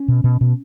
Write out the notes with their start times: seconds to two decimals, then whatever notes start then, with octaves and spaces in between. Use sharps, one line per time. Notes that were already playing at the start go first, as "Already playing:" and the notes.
Already playing: C#4
0.08 B2
0.24 B2
0.41 B2